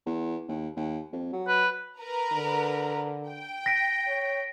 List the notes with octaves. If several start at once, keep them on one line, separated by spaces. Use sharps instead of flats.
E2
D#2
D#2
F2
F#3
B4
A#4 B4 A#5
D3
G5
A#6 B6 D7
C#5